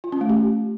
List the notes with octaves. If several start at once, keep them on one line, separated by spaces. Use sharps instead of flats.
F4
C#4
A3
G4